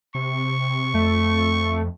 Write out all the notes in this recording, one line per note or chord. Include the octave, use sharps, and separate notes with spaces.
C3 C#6
F2 A3